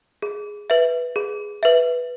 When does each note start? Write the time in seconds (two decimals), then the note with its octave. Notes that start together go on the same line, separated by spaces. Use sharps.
0.22 G#4
0.70 B4 E5
1.16 G#4
1.63 B4 E5